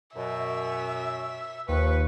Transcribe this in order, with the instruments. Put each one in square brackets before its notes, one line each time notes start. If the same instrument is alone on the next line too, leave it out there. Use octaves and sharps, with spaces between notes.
[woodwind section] F#2 B2 [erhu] E5
[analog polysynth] D#2 [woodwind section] F3 B4 [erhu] C#6